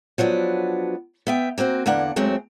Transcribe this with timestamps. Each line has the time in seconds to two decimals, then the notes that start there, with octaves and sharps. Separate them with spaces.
0.18 F3 F#3 B3 D4
1.27 B3 E5 G5
1.58 A#3 C4 F#4 C5
1.86 E2 D3 A#3 D4 F#5
2.16 D#2 F#3 G#3 A3 C4